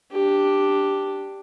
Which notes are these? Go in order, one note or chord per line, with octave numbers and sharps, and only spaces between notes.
D4 G4